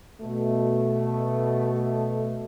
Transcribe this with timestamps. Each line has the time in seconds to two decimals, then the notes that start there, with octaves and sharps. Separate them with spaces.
0.20 B2 A3